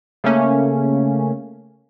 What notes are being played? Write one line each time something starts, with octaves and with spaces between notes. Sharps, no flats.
C#3 A3 A#3 C#4